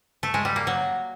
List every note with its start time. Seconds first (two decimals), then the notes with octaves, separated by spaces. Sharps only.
0.23 A3
0.34 G#3
0.45 G3
0.56 A#3
0.67 F#3